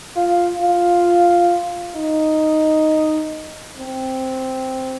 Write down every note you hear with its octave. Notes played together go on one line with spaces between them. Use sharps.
F4
F4
D#4
C4